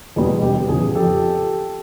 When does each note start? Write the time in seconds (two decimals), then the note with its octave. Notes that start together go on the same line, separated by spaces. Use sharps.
0.16 E2 B2 G3 G#4
0.42 E1 G4
0.68 E2 C#3 F3 G#4
0.95 F2 G4 A4